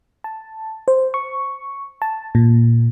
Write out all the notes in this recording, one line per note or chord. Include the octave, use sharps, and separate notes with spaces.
A5
C5
C#6
A5
A#2